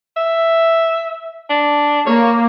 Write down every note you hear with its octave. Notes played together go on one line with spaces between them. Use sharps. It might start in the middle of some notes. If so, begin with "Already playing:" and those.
E5
D4
A#3 C#5